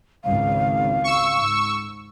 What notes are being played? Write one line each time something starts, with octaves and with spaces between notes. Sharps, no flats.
G#1 C#2 C#3 F5
C#6 E6
G#2